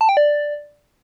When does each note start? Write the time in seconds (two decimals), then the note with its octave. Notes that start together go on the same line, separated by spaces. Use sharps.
0.01 A5
0.09 G5
0.17 D5